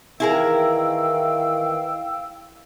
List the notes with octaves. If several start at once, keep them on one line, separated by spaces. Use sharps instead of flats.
D#3 E3 E4 G#4 A#4 F5 G5 E6